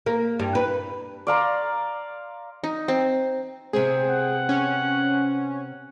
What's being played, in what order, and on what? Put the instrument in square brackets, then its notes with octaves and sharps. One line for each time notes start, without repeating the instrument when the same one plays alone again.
[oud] A#3
G2
B4
[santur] D5 F5 A#5 C6
[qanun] D#4
C4
[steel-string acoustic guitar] C3 B3 C4 [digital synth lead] G#4
[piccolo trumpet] F#5
[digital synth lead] C#4